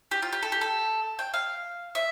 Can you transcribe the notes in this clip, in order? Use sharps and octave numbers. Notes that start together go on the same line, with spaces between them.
G4
F4
G4
A4
G4
A4
G5
F5
E5